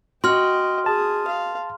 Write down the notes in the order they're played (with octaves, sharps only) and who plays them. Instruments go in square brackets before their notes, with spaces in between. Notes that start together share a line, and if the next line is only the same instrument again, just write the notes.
[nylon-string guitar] F#4 [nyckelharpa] D#5 G5 [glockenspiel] C6 F6
[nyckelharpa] G#4 D#6 [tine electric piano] A5
[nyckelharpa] F5